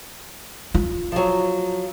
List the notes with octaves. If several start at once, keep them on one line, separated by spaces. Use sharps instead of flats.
F4
F3 F#3